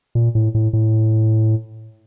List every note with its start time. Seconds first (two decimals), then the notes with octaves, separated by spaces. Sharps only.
0.15 A#2
0.35 A2
0.55 A2
0.73 A2